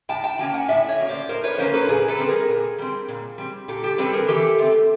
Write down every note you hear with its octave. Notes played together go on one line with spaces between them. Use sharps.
A2 G5 A5
G5 A5
F#3 A#3 C#4 G5 A5
F#5 G#5
A2 D5 E5
C#5 D#5
F#3 A#3 C#4
C5 D5
A2 A#4 C5
B4 C#5
B4
F#3 A#3 C#4 A#4 C5
A4 B4
A#2 G#4 A#4
A4 B4
G3 C4
G#4 A#4
A#2
G3 C4
A#2
G3 C4
A#2 G4 A4
G4 A4
G3 C4 A4 B4
G#4 A#4
E3 G4 A4
A3 C4